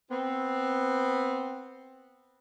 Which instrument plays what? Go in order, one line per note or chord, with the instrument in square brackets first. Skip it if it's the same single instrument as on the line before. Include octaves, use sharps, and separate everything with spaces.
[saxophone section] B3 C4